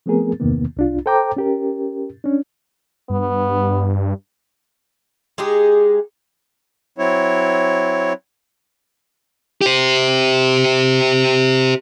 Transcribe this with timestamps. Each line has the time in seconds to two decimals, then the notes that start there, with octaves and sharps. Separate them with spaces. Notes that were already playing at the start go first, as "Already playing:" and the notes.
0.06 F3 A3 B3 C4 G#4 A#4
0.40 E2 G2 C3 D#3 A#3 B3
0.77 C2 D4 F4
1.06 A4 C5 G5 A#5 D6
1.37 C#4 G4 A#4
2.24 C#4 D4
3.10 G2 B3
5.38 G#3 D#4 G4 G#4
6.98 F#3 C4 E4 C#5
9.61 G4 C5